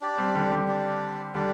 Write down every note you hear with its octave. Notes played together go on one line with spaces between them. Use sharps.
D4 G4 D5
G3 C4
D3 G3
D3 G3
D4 G4 D5
D3 G3 D4 G4 D5